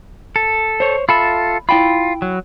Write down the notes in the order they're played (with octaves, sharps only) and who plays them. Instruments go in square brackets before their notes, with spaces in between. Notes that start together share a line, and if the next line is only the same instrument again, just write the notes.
[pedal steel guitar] A4
[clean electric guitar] C5 C#5
[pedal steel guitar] F4 A4 E5 [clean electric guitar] B5
[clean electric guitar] E4 G5 B5 [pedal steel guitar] F4
[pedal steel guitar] F#3